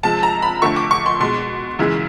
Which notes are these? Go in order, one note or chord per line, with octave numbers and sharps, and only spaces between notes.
C3 F3 G#3 A5
A#5
B5
F2 D3 F3 A3 C#6
D6
C#6
C6
B2 G#3 C6
F#2 C#3 E3 G#3